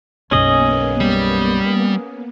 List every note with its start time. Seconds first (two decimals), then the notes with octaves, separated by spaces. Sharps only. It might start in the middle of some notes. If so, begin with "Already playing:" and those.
0.31 B1 F#2 A#3 B3 C#4 G#4 D#5
1.00 G3